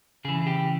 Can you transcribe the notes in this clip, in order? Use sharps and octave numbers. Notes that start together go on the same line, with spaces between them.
C#3 E3 G#4
G4